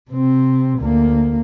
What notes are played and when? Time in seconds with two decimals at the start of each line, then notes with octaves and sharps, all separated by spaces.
0.11 C3 C4
0.79 D2 A#3